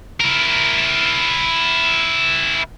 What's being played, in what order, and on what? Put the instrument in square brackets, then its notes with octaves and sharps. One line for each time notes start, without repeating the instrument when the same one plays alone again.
[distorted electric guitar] E4 A#4